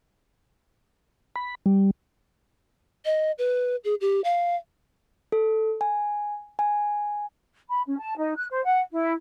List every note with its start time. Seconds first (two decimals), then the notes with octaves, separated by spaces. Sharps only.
1.36 B5
1.66 G3
3.05 D#5
3.38 B4
3.84 G#4
4.01 G4
4.24 F5
5.32 A4
5.81 G#5
6.59 G#5
7.69 B5
7.87 C#4
7.99 A5
8.17 D#4
8.36 F#6
8.50 C5
8.65 F#5
8.91 E4